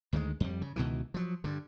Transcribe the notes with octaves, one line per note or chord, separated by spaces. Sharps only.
D2 D#3 F3 G#3
F2 G3
C#3
C#2 B2 D#3 E3
F3 F#3
G2 D3